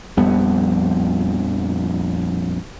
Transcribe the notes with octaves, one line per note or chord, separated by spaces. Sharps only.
A#1 F2 G3 B3